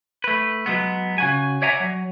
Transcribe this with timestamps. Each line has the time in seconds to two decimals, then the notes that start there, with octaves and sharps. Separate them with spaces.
0.24 A3 B4
0.66 F#3 G#3 B3
1.18 C#3 F#4 G#5
1.62 C#5 D5 E5 F#5 G#5 A#5
1.80 F#3